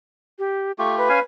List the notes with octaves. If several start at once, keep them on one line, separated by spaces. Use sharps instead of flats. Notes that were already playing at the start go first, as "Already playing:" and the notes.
G4
A3 F4 G4 C#6
B4
C#4 F5 G#5